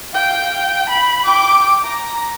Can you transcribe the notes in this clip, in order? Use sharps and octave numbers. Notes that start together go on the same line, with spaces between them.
F5 G5
B5
G5 D6
A#5